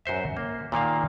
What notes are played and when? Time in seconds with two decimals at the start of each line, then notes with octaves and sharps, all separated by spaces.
0.06 F#2 F#4 C5 E5
0.37 A#3
0.72 A#2 D#3 A#3 F5